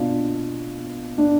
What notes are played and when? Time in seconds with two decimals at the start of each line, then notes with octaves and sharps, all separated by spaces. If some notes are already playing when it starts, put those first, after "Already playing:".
Already playing: B2 D4 F4
1.18 D4